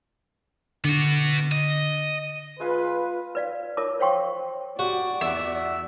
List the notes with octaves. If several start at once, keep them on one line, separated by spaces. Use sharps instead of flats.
D3 B3 F#4
D#5
G#3 F4 B4 G#5
B4 D5 F5
F4 A#4 C#5 A5 D6
C5 C#5 F5 G5 C6 C#6
F#4 G4 D5
E2 E5 F#5